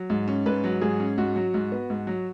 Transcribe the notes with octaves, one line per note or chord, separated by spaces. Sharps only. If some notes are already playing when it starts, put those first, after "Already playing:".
Already playing: F#3
G#2
C#4
G#2 B4
F#3
G#2 G#4
C#4
G#2 F#4
F#3
G#2
B3
G#2
F#3